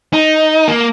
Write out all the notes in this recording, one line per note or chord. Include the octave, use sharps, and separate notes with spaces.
D#4
A#3